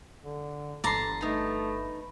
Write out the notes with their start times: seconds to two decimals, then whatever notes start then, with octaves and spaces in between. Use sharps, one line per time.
0.24 D3
0.84 G1 E3 A4 A5 A#5 C6 D6
1.21 A3 B3 D#4